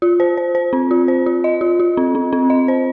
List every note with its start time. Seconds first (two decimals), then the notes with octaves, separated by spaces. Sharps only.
0.02 F4
0.20 C5
0.37 C5
0.55 C5
0.73 C4
0.91 F4
1.08 C5
1.26 F4
1.44 D#5
1.61 F4
1.80 F4
1.97 C4
2.15 C4
2.33 C4
2.50 D#5
2.68 C5